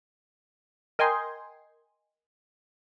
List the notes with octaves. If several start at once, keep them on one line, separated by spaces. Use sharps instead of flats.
A#4 D#5 G5 G#5 C6